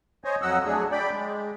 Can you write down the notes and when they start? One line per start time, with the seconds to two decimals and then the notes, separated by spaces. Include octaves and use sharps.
0.24 C5 C#5 D#5 G#5
0.42 F2 F#3 D#5 F#5 E6
0.66 F#3 A3 D4 G#4
0.92 D5 G5 B5
1.13 G#3